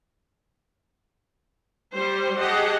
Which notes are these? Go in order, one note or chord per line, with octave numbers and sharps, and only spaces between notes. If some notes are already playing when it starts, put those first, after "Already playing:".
G3 C5
G4 G#4 D#5 F#5 A5